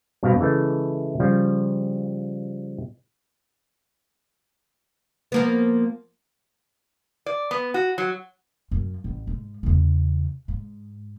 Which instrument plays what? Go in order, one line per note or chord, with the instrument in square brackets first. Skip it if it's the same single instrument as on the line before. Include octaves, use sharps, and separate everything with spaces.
[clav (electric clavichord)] G2 B2 C4 F5
C#3 E3 G#3 A3
C#3 F3 G3
[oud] F3 A#3 B3
[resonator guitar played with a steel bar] D5
B3
F#4
F#3
[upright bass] F#2
A1
G#2
E2 C#3
G#2